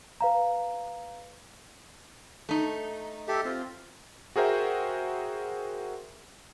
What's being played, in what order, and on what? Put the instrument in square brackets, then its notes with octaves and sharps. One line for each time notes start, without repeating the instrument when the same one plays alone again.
[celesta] B4 F5 A#5
[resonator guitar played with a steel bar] A3 D#4
[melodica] G4 A4 E5
C4 F4
[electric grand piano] F#4 G#4 A#4 C5 E5 G5